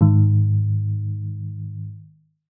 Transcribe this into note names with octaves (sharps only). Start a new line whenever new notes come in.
G#2 D#3